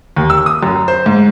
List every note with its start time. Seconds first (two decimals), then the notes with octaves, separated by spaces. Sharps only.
0.17 D#2
0.30 E6
0.46 D#6
0.63 F#2
0.88 C5
1.06 G#2